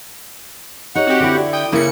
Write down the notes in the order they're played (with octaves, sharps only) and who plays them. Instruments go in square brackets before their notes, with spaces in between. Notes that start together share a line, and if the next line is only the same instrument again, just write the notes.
[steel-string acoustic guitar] D#4 C#5 [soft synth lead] G4 [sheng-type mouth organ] F#5
[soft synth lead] C4 [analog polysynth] F#4 G4
[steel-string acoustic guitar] D3 E4
[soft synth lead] D5
[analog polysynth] G5 [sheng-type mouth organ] D#6
[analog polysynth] C#3 C#7 [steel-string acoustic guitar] A#3 E4